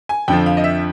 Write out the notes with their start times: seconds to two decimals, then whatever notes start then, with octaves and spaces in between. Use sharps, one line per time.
0.09 G#5
0.28 F2 D3 F3 G5
0.46 F5
0.57 D#5
0.64 E5